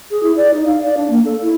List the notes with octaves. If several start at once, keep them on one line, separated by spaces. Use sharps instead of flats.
G#4
E4
D5
D#4
F5
D5
D4
A#3
A4
E4